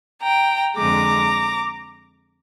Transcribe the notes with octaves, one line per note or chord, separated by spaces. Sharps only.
G5 A#5
F2 D3 G#3 A#5 D6